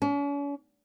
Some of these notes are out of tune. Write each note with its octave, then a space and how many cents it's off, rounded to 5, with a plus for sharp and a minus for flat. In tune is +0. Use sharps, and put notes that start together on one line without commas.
C#4 +45